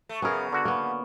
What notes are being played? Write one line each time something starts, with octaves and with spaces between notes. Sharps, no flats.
A3
F#2 C#3 B3 G#4 A#4
D3 F#4
A#3 B3